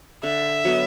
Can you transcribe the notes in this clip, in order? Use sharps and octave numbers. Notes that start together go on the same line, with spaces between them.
D3 E5
F#3 B3